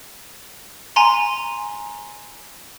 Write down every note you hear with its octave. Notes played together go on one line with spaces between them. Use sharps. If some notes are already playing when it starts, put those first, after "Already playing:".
G#5 A#5 C6